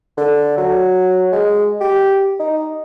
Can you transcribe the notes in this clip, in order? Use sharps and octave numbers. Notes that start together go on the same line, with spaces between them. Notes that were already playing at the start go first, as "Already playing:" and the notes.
D3
F#3
G#3
G4
D#4